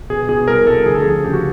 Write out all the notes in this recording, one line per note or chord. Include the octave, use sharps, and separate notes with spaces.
B2 G#4
B2 G#4
C2 A#4
C2 A4
D2 G#4
A4
F3 G#4
C#3 G4
F#4